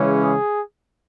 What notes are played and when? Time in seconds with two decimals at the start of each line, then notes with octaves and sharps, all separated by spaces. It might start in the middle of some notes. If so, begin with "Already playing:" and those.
Already playing: C#3 E3 G#3 C#4
0.21 G#4